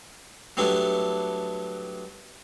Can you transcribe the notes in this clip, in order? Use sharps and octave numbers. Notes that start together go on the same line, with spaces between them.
F#3 G3 A3 B3 D4 E4